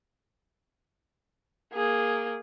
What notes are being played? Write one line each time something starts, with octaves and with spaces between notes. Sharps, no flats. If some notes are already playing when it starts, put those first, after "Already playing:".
A#3 G#4